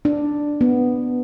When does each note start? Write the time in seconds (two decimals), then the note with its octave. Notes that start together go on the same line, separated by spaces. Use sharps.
0.05 D4
0.61 B3